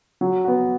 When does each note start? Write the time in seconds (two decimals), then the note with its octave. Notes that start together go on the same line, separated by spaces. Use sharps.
0.21 F#3
0.44 B3 F#4